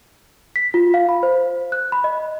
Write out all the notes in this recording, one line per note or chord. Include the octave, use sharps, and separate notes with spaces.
B6
F4
F5
B5
C5
F#6
B5
D#5